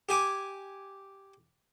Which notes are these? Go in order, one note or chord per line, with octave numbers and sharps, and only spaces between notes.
G4 G#5 D6